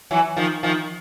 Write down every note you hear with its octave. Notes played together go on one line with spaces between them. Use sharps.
E3 F#3
D#3 F3
D#3 F3